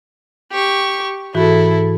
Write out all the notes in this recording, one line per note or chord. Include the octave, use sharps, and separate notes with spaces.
G4 C#6
G#2 E3 E4 F#4 A4